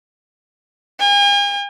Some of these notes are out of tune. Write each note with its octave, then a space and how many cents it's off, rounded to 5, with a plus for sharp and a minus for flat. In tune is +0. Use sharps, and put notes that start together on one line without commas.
G#5 -45